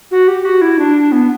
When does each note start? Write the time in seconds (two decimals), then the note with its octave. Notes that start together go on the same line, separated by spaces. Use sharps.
0.11 F#4
0.28 G4
0.45 F#4
0.62 E4
0.79 D4
1.12 B3